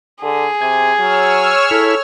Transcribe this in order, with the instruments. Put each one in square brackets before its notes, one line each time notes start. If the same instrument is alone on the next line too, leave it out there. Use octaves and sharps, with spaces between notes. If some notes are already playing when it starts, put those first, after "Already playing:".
[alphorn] D3 [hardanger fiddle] G#4
[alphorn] C3 [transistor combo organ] G#5
[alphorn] F#3 [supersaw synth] C#5 E6 F6
[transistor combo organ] E4 [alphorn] A4